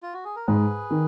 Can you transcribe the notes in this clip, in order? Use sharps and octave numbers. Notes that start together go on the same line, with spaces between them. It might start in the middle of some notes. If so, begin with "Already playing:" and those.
F4
F#4
G#4
A#4
G#2 G#4 B4
D#3